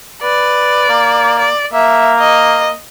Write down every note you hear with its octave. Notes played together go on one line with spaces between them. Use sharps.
B4 D5
A#3
D5
A#3 E5
D#5